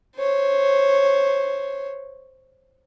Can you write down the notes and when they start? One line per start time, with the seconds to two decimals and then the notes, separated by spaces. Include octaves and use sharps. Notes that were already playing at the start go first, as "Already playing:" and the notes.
0.17 C5 C#5